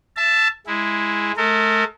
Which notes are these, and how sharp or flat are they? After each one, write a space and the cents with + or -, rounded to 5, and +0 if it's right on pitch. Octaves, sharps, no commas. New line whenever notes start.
E5 +25 A5 +0
G#3 +0 E4 +0
A3 -40 A#4 -45